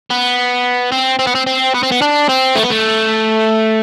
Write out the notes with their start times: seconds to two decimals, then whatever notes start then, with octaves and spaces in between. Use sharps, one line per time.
0.10 B3
0.92 C4
1.19 C4
1.27 B3
1.35 C4
1.47 C4
1.74 B3
1.83 C4
1.92 B3
2.02 D4
2.29 C4
2.55 A3
2.63 B3
2.70 A3